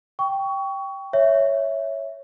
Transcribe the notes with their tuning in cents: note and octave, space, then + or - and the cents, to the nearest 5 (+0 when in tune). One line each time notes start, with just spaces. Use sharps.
G5 +0 C#6 +20
C#5 +0 E5 +0